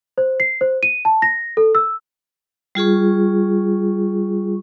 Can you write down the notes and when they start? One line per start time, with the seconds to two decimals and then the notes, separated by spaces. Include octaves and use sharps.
0.18 C5
0.40 C7
0.61 C5
0.83 D#7
1.05 A5
1.22 A#6
1.57 A4
1.75 E6
2.75 G3 F4 G#4 C#6